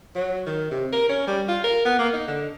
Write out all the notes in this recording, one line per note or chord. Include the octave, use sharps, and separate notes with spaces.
F#3
D#3
C3
A#4
C#4
G3
F4
A#4
B3
A#3
D#4
D3